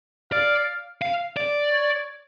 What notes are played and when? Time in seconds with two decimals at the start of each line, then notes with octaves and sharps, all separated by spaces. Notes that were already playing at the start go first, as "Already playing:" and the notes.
0.32 D5 F5
1.02 F5
1.37 D5
1.71 C#5